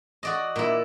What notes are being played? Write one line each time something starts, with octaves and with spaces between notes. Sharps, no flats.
F#4 D5 D#5
A#2 E4